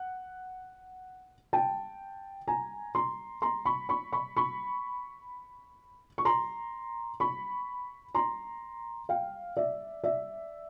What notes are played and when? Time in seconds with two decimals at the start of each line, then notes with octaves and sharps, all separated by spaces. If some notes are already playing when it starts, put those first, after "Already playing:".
Already playing: F#5
1.53 G5 A5
2.48 G#5 A#5
2.95 A#5 C6
3.42 A#5 C6
3.65 B5 C#6
3.89 B5 C#6
4.13 B5 C#6
4.37 B5 C#6
6.18 C#6
6.25 A#5 C6
7.20 B5 C#6
8.15 A#5 C6
9.09 F5 G5
9.57 D5 E5
10.04 D5 E5